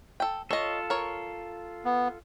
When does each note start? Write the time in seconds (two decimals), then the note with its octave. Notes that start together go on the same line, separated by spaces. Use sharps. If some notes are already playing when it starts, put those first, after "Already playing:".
0.20 A4 G5
0.51 F4 A4 C#5 D#5
0.90 A#4 C#5
1.85 B3